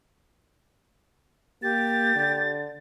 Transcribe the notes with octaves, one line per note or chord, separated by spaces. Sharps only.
A#3 G4 A6
D3